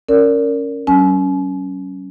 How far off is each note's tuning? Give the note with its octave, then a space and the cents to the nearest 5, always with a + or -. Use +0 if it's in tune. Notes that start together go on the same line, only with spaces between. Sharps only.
C#4 +0 A#4 -15 D5 -25
F#3 +40 C#4 +0 G#5 +45